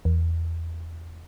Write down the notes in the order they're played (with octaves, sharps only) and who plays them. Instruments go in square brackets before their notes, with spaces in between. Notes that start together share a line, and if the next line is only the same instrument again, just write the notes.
[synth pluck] E2